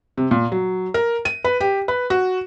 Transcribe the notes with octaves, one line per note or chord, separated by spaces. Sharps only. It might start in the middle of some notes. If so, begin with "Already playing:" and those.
C3
A#2
F#3
A#4
D#7
B4
G4
B4
F#4